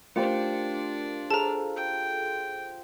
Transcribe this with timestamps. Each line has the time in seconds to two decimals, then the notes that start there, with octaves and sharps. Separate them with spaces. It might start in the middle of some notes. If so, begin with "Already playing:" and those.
0.16 A3 D4 F4 G4 A#4 C5 D5 C#7
1.31 G#4 A4 A5 A#5
1.76 G5